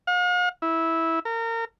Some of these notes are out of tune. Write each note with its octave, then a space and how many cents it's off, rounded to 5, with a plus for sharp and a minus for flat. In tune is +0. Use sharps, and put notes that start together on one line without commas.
F5 +45
E4 -10
A#4 -30